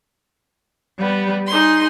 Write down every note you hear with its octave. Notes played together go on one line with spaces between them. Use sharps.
G3 B3
D#4 G#4 C6